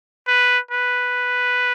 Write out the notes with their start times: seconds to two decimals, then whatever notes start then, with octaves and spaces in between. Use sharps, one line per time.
0.27 B4
0.71 B4